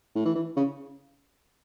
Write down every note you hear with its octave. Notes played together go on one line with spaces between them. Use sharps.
A2
E3
E3
C#3